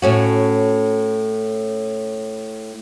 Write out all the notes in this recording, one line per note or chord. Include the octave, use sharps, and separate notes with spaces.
A2 C#4 F#4